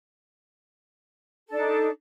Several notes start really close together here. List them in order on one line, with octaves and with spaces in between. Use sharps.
A4 D4 D#4